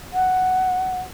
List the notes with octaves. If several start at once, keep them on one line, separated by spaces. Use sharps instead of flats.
F#5